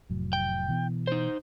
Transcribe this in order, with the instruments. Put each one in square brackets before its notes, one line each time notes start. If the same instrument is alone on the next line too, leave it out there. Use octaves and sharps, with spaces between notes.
[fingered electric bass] F1 A2 F#3
[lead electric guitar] G5
[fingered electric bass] B2 E3 B3
[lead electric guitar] D#4 C5